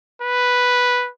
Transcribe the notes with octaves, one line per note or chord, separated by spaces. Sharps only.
B4